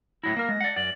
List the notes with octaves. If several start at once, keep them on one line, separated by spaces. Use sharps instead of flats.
A2 F#3 E4 A#6
A#3 A#4
G#3
D5 F#5
F#2 D5 F#7